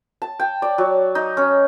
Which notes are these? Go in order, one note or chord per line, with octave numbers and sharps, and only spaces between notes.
A5
G5
D5
F#3
D#4
C#4